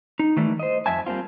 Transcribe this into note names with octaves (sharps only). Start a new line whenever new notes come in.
D#4
D#3 E3 G3 A3
C5 D#5
F2 E5 G#5 A5
G3 A#3 C4 F4